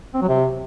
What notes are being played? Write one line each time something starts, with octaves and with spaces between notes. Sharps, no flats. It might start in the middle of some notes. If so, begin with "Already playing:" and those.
C4
F#3
C3